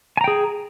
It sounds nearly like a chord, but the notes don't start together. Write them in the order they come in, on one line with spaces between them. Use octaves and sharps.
G#5 A#5 G5 G#4